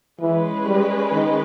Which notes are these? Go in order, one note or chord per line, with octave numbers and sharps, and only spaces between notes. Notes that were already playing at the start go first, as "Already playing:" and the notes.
E3 G#3 C#4 G#4 B4
G3
D#3